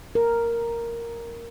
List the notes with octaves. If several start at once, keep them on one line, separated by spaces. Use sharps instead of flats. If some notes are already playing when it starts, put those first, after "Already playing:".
A#4